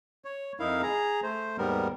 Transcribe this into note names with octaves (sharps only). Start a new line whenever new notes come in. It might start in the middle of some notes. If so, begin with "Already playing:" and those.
C#5
F2 D#4 E4 A#4 F5
G#4 A#5
A3 C5
D#2 G#2 G3 B3 A#4